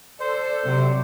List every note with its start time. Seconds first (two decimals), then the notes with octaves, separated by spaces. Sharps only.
0.20 A4 C5 D5
0.64 C3 F#3